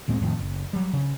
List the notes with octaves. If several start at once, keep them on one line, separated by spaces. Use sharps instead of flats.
D2 A#2 G#3 C4
F2 A2 D#3
F#1
F#3 G3
C#3